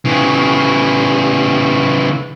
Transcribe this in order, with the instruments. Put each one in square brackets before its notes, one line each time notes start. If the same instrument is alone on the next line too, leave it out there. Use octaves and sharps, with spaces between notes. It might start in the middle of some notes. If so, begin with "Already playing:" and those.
[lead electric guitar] C#3 E3